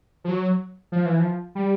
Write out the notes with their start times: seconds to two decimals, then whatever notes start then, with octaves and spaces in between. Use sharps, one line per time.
0.24 F3
0.29 F#3
0.92 F3
1.06 E3
1.20 F3
1.55 G3